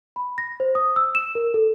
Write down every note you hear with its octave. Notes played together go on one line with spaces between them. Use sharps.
B5
A#6
C5
D#6
E6
E7
A#4
A4